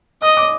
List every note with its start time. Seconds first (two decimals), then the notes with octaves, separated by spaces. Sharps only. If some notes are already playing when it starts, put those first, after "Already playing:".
0.22 D#5 D#6
0.37 D6